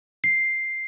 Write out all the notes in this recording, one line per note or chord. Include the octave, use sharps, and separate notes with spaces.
C7